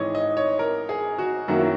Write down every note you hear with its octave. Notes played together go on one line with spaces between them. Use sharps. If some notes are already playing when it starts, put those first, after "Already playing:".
Already playing: G#1 G#2 E3 C#5 D#5
D#5
C#5
A#4
G#4
F#4
F#2 D#3 F#3 A#3 F#4
E4